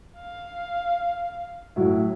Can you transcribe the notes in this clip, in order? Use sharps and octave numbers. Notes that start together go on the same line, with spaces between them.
F5
A2 F#3 E4